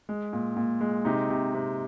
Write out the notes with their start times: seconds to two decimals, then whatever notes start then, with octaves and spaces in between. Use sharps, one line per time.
0.09 G#3
0.33 A#2
0.56 A#2
0.81 G#3
1.05 C3 D#4
1.30 C3
1.54 C3